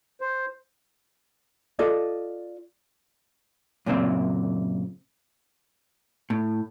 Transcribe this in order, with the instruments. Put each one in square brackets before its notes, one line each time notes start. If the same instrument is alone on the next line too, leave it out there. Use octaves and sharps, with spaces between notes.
[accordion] C5
[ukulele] F4 A4 D5 D#5
[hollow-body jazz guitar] F#2 A#2 C#3 C4
A2